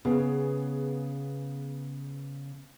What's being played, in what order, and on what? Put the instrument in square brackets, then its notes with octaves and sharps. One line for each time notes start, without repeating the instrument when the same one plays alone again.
[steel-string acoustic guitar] C#3 [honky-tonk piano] B3 G#4